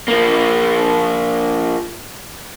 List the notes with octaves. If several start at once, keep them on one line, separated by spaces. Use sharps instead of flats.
F3 A#3